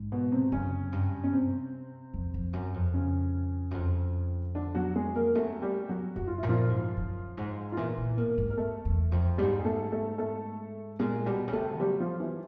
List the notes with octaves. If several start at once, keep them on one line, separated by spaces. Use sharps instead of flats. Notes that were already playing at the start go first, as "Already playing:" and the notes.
Already playing: G#2
B2 B3
C3 C4
F#2 C#3 C#4
G2
C#4
C3 C4
F2
F2
F#2
F2
C#3 C#4
F#2
F2
D3 D4
F#3 F#4
G#3 G#4
A#3 A#4
F#2 A3 A4
G3 G4
F#3 F#4
F#2 F#4
F4
A#2 E4
F3 F4
G#2
F#2
G#2
F4
A#2 E3 E4
A#2
A2 A#3 A#4
G#2
A#4
A3 A4
E2
F2
G#2 G3 G4
G#4
A3 A4
A3 A4
A3 A4
A#2 G#3 G#4
B2 G3 G4
C#3
C3 A3 A4
F#3 G3 G4
F3 F4
E3 E4